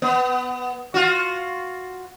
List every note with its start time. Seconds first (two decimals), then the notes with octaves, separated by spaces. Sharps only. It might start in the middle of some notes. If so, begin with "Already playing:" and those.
0.02 B3
0.94 F4 F#4